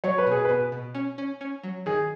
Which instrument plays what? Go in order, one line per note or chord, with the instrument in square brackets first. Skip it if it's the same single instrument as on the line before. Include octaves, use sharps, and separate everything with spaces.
[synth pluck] F#3 [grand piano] C#5
[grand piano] B4
[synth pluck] B2 [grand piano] G#4
[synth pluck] B2 [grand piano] B4
[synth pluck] B2
C#4
C#4
C#4
F#3
[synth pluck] D#3 [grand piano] G#4